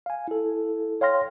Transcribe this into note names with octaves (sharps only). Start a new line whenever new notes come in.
F5 G#5
E4 A4
C#5 F5 G5 C6 F6 A#6